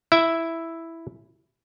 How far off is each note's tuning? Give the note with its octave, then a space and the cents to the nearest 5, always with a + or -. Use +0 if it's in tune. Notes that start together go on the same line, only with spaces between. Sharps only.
E4 +0 E5 +0